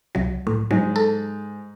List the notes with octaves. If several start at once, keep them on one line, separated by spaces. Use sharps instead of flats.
C2 F#3
A2
G#2 F#3
A4